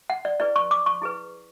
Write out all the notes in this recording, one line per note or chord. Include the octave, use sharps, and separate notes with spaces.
F#5
D5
E4 G#4 B4 D5
C#6
D6
C#6
E4 G#4 B4